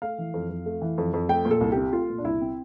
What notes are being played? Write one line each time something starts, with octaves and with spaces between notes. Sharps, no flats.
A3 F5
E3
F2
F2
A3
E3
F2
F2
A3 G5
A#2
A4
C2
C4 G4
A3 F4
A#2
D4
C2 E4
C4